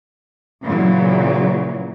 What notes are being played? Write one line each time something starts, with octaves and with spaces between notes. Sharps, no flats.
A#2 C#3 E3 F#3